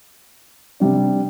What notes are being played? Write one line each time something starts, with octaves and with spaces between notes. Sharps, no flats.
C3 G3 D4